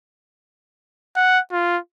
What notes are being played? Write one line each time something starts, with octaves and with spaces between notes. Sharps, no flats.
F#5
F4